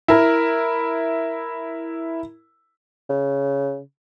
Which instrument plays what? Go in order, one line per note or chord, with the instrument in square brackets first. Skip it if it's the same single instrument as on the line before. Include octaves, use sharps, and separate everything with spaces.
[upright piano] E4 A#4
[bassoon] C#3